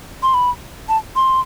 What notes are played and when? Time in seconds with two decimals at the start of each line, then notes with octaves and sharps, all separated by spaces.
0.23 C6
0.34 B5
0.89 A5
1.16 C6